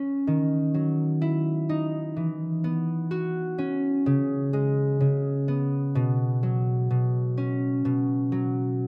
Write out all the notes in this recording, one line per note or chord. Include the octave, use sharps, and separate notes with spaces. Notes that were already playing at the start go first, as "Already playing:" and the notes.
Already playing: C#4
D#3
F#3
E4
D#4
E3
B3
F#4
C#4
C#3
G#3
C#3
B3
B2
F#3
B2
C#4
B2
F#3